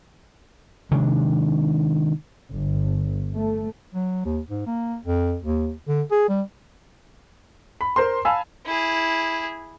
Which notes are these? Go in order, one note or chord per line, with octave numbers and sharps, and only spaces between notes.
C3 D#3 G#3 D4
G1
A3
F#3
D#2
G#2
A#3
F2
D#2
D3
G#4
G3
B5
A#4 C5 A#5 C6
F5 G#5 A5 B5 E6
E4 G#4